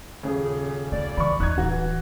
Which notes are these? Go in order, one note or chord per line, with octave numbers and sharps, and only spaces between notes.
D#1 C#3 G#4
A3 A#3 D5
C#2 E3 B5 C#6
D#2 B3 D#4 F#6 G#6
D1 E3 F#4